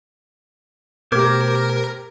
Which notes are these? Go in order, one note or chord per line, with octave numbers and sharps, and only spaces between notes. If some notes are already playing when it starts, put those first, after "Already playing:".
B2 A3 G4 A#4 C5 D6 G#6